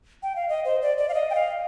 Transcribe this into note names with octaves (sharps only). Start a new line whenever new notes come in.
G5
F5
D#5
C5
D5
D5
F5
D#5
G5
F5